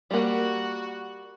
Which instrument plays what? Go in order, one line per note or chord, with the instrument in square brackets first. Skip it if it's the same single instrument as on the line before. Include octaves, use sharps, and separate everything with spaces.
[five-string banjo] G3 A#3 [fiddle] F#4 F#5